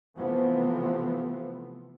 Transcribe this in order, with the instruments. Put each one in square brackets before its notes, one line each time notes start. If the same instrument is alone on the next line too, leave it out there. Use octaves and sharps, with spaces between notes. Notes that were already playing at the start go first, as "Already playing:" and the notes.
[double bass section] C3 E3 F3 A3 B3 C4